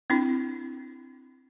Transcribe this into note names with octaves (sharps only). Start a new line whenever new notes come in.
C4 D4 E4